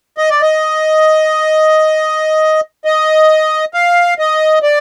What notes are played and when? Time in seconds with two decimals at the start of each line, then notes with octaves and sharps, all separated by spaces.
0.18 D#5
0.30 D5
0.41 D#5
2.85 D#5
3.74 F5
4.19 D#5
4.63 D5